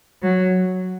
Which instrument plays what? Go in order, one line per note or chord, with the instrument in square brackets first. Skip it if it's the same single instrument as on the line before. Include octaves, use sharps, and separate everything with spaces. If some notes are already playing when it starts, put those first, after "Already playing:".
[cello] F#3